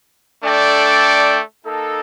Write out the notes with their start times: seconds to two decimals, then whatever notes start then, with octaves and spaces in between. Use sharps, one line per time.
0.43 A3 D4 A4 D5 G5
1.66 A#3 D#4 A4